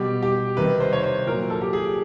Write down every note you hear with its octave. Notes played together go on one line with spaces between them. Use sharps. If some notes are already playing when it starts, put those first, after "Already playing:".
Already playing: B2 G3 G4
G4
C3 D#3 G3 B4
C5
C#5
C5
A#2 F#3 A#4
A4
G4
G#4